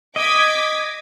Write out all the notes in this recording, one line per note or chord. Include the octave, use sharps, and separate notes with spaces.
D#5 D6 G#6 B6